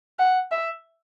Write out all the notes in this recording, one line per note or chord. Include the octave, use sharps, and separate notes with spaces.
F#5
E5